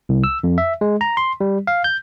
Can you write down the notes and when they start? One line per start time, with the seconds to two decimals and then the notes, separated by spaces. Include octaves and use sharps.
0.09 C2
0.24 E6
0.44 F2
0.58 E5
0.81 G#3
1.01 A#5
1.17 C6
1.41 G3
1.67 F5
1.84 G6